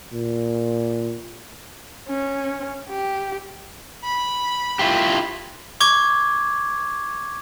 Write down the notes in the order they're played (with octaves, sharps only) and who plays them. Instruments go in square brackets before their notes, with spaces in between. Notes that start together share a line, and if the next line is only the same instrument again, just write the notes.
[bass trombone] A#2
[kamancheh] C#4
G4
[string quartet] B5
[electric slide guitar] E4 F4 G4
[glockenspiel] C#6 D6 G#6